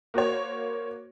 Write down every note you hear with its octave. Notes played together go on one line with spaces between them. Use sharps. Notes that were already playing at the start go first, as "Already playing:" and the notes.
A#3 F#4 C5 C#5